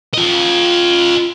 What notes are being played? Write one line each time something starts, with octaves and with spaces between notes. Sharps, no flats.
F4 D#5